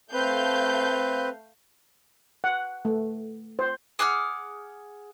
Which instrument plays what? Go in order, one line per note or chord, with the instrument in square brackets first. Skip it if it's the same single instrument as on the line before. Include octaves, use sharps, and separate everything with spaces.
[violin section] A3 F5 G6 [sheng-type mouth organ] C4 B4
[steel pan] F#5
A3
C5
[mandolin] G#4 F#5 D6 F6